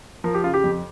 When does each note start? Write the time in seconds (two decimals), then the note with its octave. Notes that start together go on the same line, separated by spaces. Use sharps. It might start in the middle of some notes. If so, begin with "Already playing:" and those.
0.24 F3 A#4
0.34 G4
0.44 C#3 F4
0.54 G4
0.64 F2